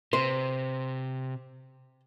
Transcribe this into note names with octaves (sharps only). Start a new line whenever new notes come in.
C3 C5